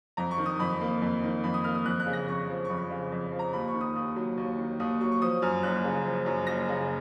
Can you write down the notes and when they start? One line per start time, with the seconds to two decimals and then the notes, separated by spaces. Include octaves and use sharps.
0.17 F2 A#5
0.31 C#6
0.38 D#3
0.46 D#6
0.59 F2 B5
0.81 A#3
1.02 F2
1.23 D#3
1.44 F2 B5
1.54 D#6
1.64 A#3 F6
1.75 D#6
1.86 F2 F#6
2.00 F#6
2.06 C#3
2.13 A#6
2.27 F2 C#6
2.49 F3
2.65 C#6
2.69 F2 B5
2.90 C#3
3.12 F2
3.32 F3
3.39 A#5
3.53 D#2 B5
3.68 C#6
3.74 D#3
3.81 D#6
3.96 D#2 D#6
4.16 F#3
4.37 D#2
4.58 D#3
4.80 D#2 D#6
5.01 F#3 C#6
5.12 C#6
5.22 F3 D#6
5.42 F#2 F6
5.63 F#1 F#6
5.84 C#3
6.05 F3
6.26 F#2
6.47 F#1 A#6
6.69 C#3